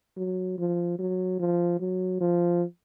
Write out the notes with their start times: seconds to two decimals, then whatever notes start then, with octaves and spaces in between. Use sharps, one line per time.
0.17 F#3
0.58 F3
0.99 F#3
1.39 F3
1.80 F#3
2.21 F3